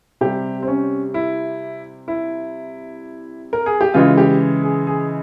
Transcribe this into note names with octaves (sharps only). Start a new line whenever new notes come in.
C3 G3 G4
C4
C#4
E4
E4
A#4
G#4
G4
C#3 E3 G#3 F4
G4
G#4
G#4